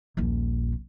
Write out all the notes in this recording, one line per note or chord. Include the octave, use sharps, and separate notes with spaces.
D#1 A#1